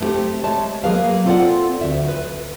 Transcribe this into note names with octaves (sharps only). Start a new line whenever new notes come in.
A3 B3 C4 G4 A4
G#3 A3 C#5 A5
F#3 A#3 G#4 A4 B4 F5
C4 F4 A4 B4 D5 F#5
D2 D#3 E5
B4